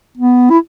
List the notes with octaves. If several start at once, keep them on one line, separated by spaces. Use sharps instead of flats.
B3
E4